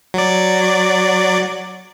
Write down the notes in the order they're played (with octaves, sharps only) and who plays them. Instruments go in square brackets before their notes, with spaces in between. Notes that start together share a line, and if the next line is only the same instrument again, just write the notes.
[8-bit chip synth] F#3 D5